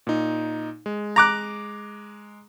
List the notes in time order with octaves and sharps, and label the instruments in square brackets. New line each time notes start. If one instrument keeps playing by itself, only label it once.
[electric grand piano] A#2 D#4
G#3
[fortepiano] A#5 D6 F#6